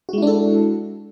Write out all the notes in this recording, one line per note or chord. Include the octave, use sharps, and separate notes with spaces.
G#3 D4 E4 F#4 A4